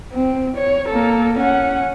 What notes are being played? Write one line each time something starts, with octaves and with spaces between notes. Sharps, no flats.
C4
C#5
A#3 A4
C#4 F#5